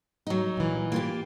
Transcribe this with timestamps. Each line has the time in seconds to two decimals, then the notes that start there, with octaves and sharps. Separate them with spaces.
0.27 F#3 D#4
0.57 A#2 E3
0.92 A#3 F4 G4